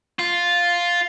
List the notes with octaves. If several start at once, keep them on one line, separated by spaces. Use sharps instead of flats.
F4